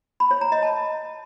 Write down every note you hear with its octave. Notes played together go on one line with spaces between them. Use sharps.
B5
C#5
A#5
D#5
A5